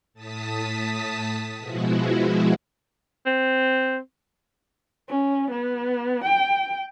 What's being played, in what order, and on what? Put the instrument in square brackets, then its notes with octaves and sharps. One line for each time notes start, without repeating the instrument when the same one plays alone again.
[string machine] A2 A5 D#6 B6
B2 F3 G#3 E4 F#4
[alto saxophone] C4
[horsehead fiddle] C#4
B3
G5